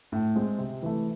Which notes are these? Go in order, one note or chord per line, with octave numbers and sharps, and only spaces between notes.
A2
G#3 C4
C3
E3 A3